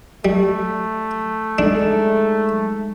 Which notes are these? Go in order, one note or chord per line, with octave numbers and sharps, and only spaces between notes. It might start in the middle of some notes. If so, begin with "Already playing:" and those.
G3 A3
G#3 D4 D#4 A4